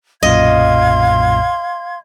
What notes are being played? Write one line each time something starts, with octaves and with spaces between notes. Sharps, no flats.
B1 F#2 A#2 D#5 F5 C6 G#6